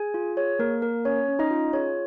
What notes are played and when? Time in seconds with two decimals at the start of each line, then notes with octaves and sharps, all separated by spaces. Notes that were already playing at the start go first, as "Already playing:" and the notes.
Already playing: G#4 G#5
0.14 F4
0.37 G#4 C#5
0.59 A#3 A#4
0.82 A#3 A#4
1.05 C#4 C#5
1.28 C#4
1.39 D#4 D#5
1.51 F4
1.73 G#4 C#5